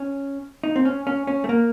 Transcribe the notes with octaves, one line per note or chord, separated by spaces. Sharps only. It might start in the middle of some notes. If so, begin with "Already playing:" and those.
Already playing: C#4
D#4
C4
C#4
C#4
C#4
A3
A#3